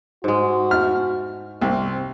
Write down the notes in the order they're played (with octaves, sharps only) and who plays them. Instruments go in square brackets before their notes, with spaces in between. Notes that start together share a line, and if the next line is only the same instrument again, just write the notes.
[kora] G#2 G#3 [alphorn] F#4
[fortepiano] F6
[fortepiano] C2 [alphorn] C4